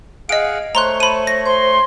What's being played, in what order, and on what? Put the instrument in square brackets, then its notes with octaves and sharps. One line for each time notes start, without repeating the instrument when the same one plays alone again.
[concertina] G#4 F5 F#5 [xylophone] D#5 D7
[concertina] A3 C#5 [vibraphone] C5 [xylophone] A#5 C6 F#6
[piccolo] A5 [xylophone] B5 D#7
[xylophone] A#6
[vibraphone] C5 [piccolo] C6